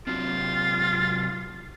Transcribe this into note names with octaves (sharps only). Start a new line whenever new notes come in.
C3 F#3 F4